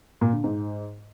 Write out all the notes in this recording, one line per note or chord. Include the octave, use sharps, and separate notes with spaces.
A#2
D3
G#2